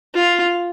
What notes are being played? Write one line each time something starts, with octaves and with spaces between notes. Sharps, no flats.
F4